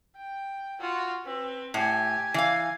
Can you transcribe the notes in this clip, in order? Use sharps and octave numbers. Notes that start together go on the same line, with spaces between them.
G5
F4 F#4
C4 B4
A2 G4 G#5
E3 F5 G#5